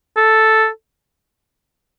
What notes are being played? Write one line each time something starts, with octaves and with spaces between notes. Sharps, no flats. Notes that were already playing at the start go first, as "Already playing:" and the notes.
A4